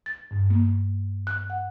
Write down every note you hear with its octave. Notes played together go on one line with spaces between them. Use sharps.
A6
G2
A#3
F#6
F#5